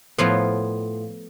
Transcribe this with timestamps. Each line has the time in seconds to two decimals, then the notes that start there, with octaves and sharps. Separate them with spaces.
0.18 A2 F3 B3 F4